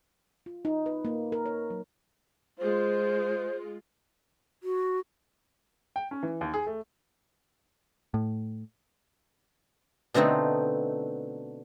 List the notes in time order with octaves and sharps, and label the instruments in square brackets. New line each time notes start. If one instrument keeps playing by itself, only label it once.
[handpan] F4
D#4
B4
A#3
A#4
C#5
F#3
[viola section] G#3 F4 [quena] C5
[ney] F#4
[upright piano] G5
C#4
E3
D#2
G#4
A3
[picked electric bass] A2
[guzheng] B2 D3 A3 C4 D#4